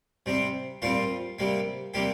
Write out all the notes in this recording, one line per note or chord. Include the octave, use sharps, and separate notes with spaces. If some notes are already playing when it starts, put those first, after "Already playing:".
C3 G3 C4
A#2 G3 C4 F4
C3 G3 A#3
C3 G3 A#3 G4